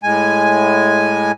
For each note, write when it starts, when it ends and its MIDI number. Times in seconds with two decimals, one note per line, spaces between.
0.03 1.32 45
0.03 1.32 56
0.03 1.32 80